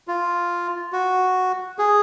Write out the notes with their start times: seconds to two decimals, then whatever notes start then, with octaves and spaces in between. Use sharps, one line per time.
0.08 F4
0.93 F#4
1.79 G#4